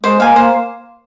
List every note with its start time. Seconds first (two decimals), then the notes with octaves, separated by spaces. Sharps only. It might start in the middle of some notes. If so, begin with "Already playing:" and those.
0.03 G#3 C5
0.20 A#3 F5 G#5
0.35 A#3 C5